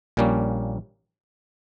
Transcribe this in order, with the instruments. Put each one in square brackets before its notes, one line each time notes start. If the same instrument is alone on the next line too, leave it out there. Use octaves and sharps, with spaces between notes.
[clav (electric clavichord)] A#1 A#2 G3 A#3 C#4